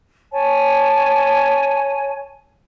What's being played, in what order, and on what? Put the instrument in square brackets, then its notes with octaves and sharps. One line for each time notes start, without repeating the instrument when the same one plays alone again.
[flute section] C#5 G#5 A5